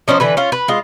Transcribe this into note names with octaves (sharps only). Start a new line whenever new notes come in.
F3 C#4 D#4 C5
D3 E3 B4
C#4 F4
B4
G#3 F4